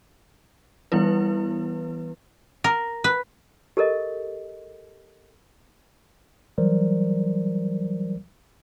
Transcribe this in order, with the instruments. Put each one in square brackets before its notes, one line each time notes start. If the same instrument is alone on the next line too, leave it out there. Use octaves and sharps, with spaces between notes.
[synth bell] E3 G3 B3 E4 B4
[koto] A#4
B4
[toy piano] G4 A4 A#4 D#5
[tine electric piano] E3 F#3 G3 A#4 C5 D5